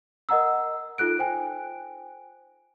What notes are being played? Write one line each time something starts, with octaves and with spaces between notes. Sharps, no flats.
A#4 D#5 F#5 A#5 E6
D#4 F4 A4 F#6 D7
C5 G5 G#5